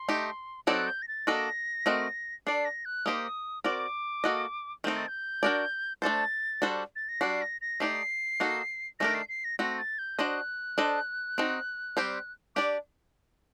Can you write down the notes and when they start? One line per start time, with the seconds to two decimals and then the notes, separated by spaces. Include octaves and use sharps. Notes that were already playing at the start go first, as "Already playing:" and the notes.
Already playing: C6
0.09 A3 D#4 G4
0.67 F#3 C4 D#4 A4 D5 F#6
0.87 G6
1.02 A#6
1.08 A6
1.27 A#3 D4 F#4 A4 D#5 A#6
1.86 A3 C4 F#4 A#4 D#5
2.47 D4 A4 D5 C7
2.65 A#6
2.85 F#6
3.06 A#3 D#4 G4 C5 D#6
3.64 C4 F#4 A#4 D5 D6
4.24 A#3 F#4 A4 D#5
4.84 D#3 A3 C4 D#4 G6
4.96 A6
5.08 G6
5.43 D4 F#4 A#4 D5
6.02 A3 D4 A4 C5 A6
6.62 G3 D4 F#4 A4 C5
6.96 A6
7.09 A#6
7.21 G3 D4 F#4 C7
7.42 A#6
7.61 A#6
7.80 A3 D#4 G4 D5 C7
8.40 A#3 D#4 F#4 A4
8.99 D#3 A3 D4 G4 A#4 A#6
9.14 C7
9.29 C7
9.44 A#6
9.59 A3 C4 F#4 A#6
9.79 A6
9.99 G6
10.18 D4 F#4 C5 D#5 F#6
10.78 D4 A4 C5 D#5
11.38 C4 D#4 F#4
11.97 G3 C4 G4 C5
12.56 D4 G4 D5 D6